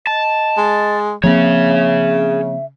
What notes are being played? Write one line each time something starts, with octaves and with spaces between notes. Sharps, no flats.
D#5 A5
G#3
C#3 F3 A#3 C4 G#4 C#5 E5